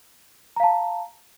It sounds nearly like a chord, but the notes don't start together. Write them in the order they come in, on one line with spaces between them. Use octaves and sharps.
A#5 F5 A5